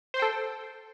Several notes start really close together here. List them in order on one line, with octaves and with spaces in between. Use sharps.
C5 C6 G5 A4